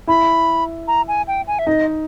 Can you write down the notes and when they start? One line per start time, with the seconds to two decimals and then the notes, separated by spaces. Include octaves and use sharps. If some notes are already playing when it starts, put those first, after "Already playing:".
0.07 E4 B5
0.88 A#5
1.08 G#5
1.27 G5
1.47 G#5
1.59 E5
1.67 D#4 D#5